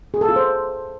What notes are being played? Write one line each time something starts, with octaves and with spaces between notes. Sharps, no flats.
G#4
A4
F4
C5